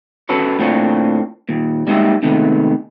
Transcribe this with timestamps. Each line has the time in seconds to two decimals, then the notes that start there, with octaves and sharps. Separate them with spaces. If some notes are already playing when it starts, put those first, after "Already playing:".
0.29 C#4 F#4 A4 B4 C#5
0.59 A2 A#3 C4 D4 F4 C#5
1.49 D#2 A#2
1.87 G3 G#3 A#3 D#4 G4 E5
2.23 C3 D#3 G#3 A3 B3